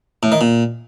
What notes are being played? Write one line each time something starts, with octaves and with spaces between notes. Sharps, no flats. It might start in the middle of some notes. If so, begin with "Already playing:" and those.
A2
D#3
A#2